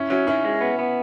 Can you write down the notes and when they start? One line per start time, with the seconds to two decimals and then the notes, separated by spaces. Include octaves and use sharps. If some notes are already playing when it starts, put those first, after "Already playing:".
Already playing: C#4 E4
0.10 F#3 C#4 E4
0.27 D#3 C#4 E4
0.45 G#3
0.61 B3
0.79 B3